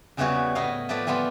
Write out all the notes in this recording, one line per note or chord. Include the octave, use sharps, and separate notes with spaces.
E2 C#3 E3 G3 E4 F#4
A2 B3 E4 D#5 F5
F3 A3 G4 A4 B4 D5
E3 G3 B3 F4 G4